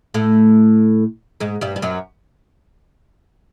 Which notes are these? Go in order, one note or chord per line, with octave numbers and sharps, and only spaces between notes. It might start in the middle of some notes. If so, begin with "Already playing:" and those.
A2 A3
G#2 G#3
G2 G3
G3
F#2 F#3